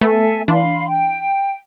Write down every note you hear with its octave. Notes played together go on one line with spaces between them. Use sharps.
A3 B3 A4 E5 G#5
E3 D4 F5 B5 C6
G5